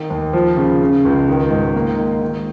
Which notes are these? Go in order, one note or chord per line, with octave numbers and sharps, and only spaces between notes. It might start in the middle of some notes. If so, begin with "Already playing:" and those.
Already playing: D#3
D#2
F3
C#3
C#3
C#2
D#3
G#2
A#3
D#3
D#3